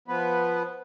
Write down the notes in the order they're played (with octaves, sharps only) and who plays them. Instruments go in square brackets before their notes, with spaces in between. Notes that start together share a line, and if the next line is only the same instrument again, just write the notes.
[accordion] F3 B3 B4